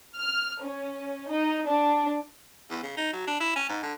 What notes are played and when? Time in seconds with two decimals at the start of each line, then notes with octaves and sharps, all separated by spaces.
0.15 F6
0.63 C#4
1.30 D#4
1.66 D4
2.70 E2
2.83 C#3
2.97 D#4
3.13 F#3
3.27 D4
3.40 E4
3.56 C#4
3.69 G#2
3.83 D3